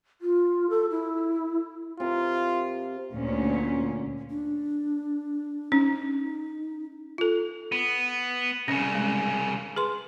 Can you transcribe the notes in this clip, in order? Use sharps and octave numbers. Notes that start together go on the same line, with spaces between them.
F4
A4
E4
C3 F4 A#4
D2 A#2 C#4
D4
C#4 D#4
F4 A4
B3
C2 C#3 C#4
G#3
G#4 B4 C6